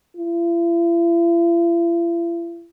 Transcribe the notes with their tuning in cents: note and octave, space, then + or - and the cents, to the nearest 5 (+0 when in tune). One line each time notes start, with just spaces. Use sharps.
E4 +45